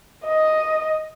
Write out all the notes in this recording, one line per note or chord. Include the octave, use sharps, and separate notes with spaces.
D#5